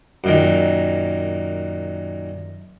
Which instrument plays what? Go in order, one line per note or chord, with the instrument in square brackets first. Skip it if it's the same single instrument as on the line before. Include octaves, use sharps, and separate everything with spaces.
[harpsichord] F#2 A#2 D#3